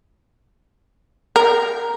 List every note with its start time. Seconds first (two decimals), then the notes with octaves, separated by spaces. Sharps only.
1.36 A#4